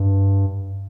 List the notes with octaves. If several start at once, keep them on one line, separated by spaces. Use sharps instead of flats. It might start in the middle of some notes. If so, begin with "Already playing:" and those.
Already playing: G2